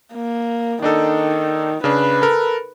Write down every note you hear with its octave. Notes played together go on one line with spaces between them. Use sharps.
A#3
D#3 D4 D#4 A4
C#3 D4 B4
A4 A#4